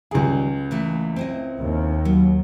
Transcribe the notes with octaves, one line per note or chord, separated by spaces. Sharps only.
C#2 D#3 G3 G#4
A#2 E3 A3
C4 E4 D#5
D#2
F#3